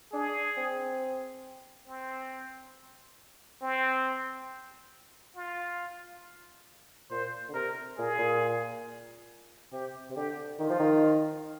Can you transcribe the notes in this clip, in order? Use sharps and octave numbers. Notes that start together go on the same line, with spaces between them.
D4 G#4
C4
C4
C4
F4
A#2 C5
D3
C3 A#4
A#2 G#4
A#2
C3 G4
C3
D3 G4
D#3 F4
F3
D#3